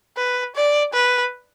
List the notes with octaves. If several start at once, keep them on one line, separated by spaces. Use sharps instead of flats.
B4
D5
B4